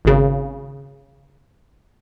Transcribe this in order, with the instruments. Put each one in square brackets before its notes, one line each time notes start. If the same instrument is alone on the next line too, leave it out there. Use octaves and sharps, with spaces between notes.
[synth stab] G#1 C#3